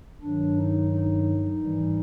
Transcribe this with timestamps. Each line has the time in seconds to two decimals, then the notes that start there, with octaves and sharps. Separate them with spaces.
0.22 G2 D#3 F#3 D4
0.58 D#4
0.92 D#4
1.61 G#2 E3 G3